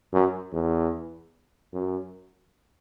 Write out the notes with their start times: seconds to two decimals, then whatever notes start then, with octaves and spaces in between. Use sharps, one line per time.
0.13 F#2
0.53 E2
1.73 F#2